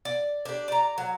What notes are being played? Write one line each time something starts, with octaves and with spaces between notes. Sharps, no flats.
D5
D4 G4
D5 A#5
F#3